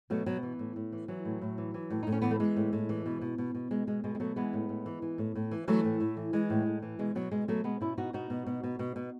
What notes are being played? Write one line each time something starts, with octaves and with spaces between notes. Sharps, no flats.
B2 F#3 A3
B2 F#3
E3
A2
A2
E3
E3 F#3
A2
A2
E3
E3
A2
D#4
A2
C#4
E3 B3
A3
E3 G#3
A2
A2
E3
B2
B2
B2
B2
B2 G#3
B2 G#3
B2 G#3
G#3
B2 F#3 A3
E3 G#3 B3
A2
A2
E3
E3
A2
A2
E3
E3 F#3 A3
A2
A2
E3
E3 G#3
A2
A2
E3
B2 G#3
B2 F#3
B2 G#3
B2 F#3 A3
B2 G#3 B3
B2 C#4 E4
B2 D#4 F#4
B2 D#4 F#4
B2
B2
B2
B2
B2